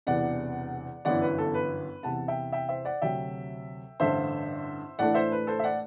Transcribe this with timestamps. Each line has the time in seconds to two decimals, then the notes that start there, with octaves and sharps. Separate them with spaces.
0.07 E1 E2 C3 E3 D5 F#5
1.05 G1 F#2 E3 B3 E4 D5 F#5
1.22 B4
1.38 A4
1.54 B4
2.03 E2 C3 E3 F#5 A5
2.28 E5 G5
2.52 E5 G5
2.69 C5 E5
2.85 D5 F#5
3.02 D2 C3 F#3 E5 G5
4.00 A1 G2 D3 C5 E5
4.99 A2 E3 A3 D4 D5 F#5
5.14 C5 E5
5.32 B4
5.47 A4 C5
5.59 E5
5.64 D5 F#5